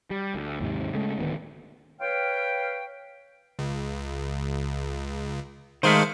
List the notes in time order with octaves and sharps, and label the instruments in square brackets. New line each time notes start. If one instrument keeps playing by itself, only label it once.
[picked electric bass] G3
D2
D#2 G#2 C3
C#3 G#3 A3
D1 D2 D#3 B3
[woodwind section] B4 C#5 F5 G5
[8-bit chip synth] C#2
[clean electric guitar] D#3 G#3 A3 [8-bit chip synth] C5 F5